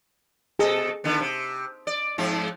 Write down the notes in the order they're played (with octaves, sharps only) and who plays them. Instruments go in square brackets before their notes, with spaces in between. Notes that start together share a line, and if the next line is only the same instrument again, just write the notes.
[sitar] B2 A4 D#5 [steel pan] G#4
[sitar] D3 D#3 B3
C3
D5
G#2 F3 C4